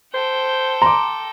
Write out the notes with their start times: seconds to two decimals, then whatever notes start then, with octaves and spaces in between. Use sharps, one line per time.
0.14 A4 C5 G5
0.82 A#5 C6 D6